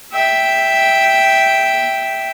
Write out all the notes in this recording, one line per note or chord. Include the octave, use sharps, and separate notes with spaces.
E5 G5